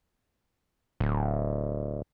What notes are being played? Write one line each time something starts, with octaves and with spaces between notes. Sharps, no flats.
D1